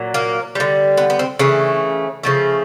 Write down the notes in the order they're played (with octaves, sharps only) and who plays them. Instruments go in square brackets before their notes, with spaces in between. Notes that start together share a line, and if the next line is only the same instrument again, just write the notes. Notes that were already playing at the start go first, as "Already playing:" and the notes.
Already playing: [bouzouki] A#2 F#3
A#3
D3 G3
B3
B3
C4
C#3 E3 A3
C#3 F3 A3